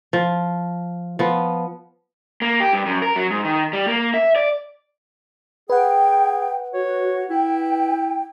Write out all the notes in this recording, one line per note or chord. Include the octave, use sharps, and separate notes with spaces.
F3
F3 B3
A#3
G4
G2
F#2
A#4
F#3
G#2
D#3
G3
A#3
E5
D5
G#4 B4 F#5 G5
F#4 C#5
E4 G5